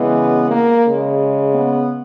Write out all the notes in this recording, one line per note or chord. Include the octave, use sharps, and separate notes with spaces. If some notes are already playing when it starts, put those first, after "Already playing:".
Already playing: C#3 E3 G#3 B3
A#3
C#3 G#3
B3